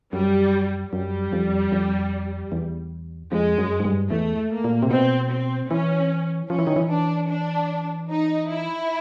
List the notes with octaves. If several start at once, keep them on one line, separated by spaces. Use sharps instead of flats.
F#2 G3
F#2 G3
F2
F2
E2
F2 G#3
F#2
G#2
G2
E2 A3
A#3
A#2
C3
B2 C4
C4
E3 C#4
F3 C#4
E3
D#3
E3
D4
D4
D#4
E4